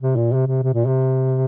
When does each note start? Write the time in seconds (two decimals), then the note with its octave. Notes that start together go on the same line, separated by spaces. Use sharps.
0.02 C3
0.16 A#2
0.33 C3
0.47 C3
0.63 C3
0.74 A#2
0.86 C3